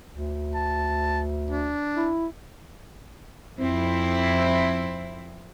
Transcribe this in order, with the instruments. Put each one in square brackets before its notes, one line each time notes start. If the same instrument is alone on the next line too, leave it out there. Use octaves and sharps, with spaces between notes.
[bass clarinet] D2
[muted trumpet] A5
D4
[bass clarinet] E4
[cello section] F2 C4 E4